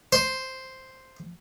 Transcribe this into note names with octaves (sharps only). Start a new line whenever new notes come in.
C5